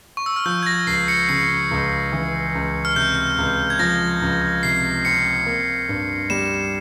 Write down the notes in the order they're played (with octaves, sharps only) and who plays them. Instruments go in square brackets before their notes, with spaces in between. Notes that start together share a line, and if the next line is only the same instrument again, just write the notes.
[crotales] C#6
E6
F6
[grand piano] F3 [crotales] G6
[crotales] G#6
A#6
[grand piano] C#2 [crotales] C7
[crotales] C#7
[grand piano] C#3 [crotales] C#7
[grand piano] C#2
E3
C#2
[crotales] F6
[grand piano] C3 [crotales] G6
[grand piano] C#2
[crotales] G#6
[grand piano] F3 [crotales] A#6
[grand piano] C#2
[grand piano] C3 [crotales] C7
[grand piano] C4 [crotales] C#7
[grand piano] A#3
G2
[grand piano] G3 [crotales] E7